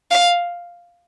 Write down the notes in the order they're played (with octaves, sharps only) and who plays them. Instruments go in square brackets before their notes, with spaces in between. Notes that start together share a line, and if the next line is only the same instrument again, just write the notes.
[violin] F5